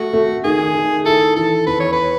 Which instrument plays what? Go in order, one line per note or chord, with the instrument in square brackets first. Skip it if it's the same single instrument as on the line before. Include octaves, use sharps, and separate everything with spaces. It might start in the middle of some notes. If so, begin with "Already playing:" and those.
Already playing: [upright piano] A3 [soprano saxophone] F#4
[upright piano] A3
[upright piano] D#3 [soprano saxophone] G#4
[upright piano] D#3
[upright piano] E4 [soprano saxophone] A4
[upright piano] E3 [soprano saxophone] A4
[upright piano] E2 [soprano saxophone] B4
[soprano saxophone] C#5
B4